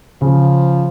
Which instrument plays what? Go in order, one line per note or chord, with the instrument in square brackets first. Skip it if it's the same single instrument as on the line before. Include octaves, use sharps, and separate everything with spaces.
[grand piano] C#3 [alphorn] F3